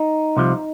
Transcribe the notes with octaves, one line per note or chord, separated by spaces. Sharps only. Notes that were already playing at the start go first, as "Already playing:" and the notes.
Already playing: D#4
C2 C3 F3